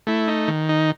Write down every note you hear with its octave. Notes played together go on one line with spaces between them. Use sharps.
A3 E4
D#4
D#3
D#4